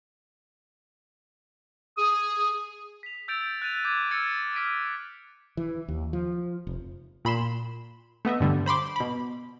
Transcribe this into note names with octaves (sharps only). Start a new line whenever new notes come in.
G#4 D#6
B6 F7
E6 G6 A6 D7 F7
F#6 A6 D#7 F7
D6 G6 G#6 D#7
E6 F6 G#6 A6 C#7 D#7
F6 A6 B6 D7 D#7
E3
D#2
F3
F1
A#2 B5 C6 E7
A3 B3 D#5 E5
G2 D3 G3
C5 B5 C6 D6
B2 B5